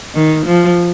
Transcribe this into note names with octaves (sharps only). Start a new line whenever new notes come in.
D#3
F3